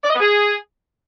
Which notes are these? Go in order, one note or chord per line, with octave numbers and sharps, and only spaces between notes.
D5
D#5
B3
G#4